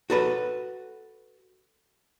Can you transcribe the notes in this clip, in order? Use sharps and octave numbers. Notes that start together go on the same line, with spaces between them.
F#4 A4 B4